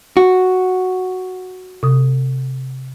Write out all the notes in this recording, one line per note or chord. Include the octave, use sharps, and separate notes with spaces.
F#4
C3 D#6